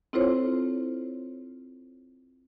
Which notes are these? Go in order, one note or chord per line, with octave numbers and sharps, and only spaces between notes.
C4 E4 F4 A4 C5 C#5